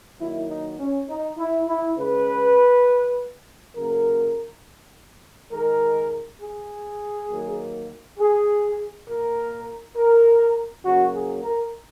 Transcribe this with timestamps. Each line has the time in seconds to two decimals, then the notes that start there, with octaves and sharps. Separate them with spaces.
0.19 D#3 F#3 A#3 E4
0.49 D#4
0.78 C#4
1.09 D#4
1.37 E4
1.67 E4
1.97 C#3 G#3 B4
3.75 C#3 F#3 A#3 A#4
5.51 D#3 G#3 A#4
6.41 G#4
7.29 D#3 F#3 A#3
8.18 G#4
9.07 A#2 A#3 A#4
9.96 A#4
10.84 C#3 F#3 A#3 F#4
11.14 G#4
11.43 A#4